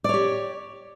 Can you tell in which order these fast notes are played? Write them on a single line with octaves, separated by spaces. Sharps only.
D5 C#5 G4